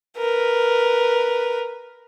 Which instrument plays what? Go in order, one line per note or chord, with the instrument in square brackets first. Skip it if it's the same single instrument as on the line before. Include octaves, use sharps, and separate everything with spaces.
[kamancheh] A#4 B4